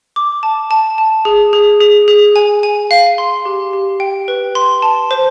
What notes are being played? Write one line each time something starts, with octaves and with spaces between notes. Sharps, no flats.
D6
A5
A5
A5
G#4
G#4
G#4
G#4
G#5
G#5
F5
C6
G4
G4
G5
B4
C6
A5
C5